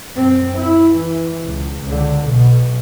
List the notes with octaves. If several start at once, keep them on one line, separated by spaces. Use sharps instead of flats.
F#2 C4
E4
E3
C#2
C#2 D3
B1 B2